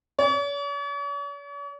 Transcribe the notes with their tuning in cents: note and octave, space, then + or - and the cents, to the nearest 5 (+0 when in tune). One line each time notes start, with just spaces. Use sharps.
C#5 +45